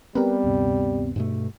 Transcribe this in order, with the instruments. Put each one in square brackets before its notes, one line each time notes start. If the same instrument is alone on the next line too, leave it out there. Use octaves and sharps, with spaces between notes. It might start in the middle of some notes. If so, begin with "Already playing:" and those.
[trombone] G3 [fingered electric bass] B3 C4 [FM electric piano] G4 A#4 B4
[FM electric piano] D2 G2 C3
[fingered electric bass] G2 B2 A3